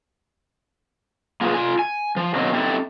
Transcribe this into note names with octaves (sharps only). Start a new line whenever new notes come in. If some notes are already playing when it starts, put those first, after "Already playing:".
A#3 F4 F#4 G#4 B4
F4 G#5
G#5
F3
B2 D#3 F#3 A#3 C4
C4 D#4 E4 G4 A4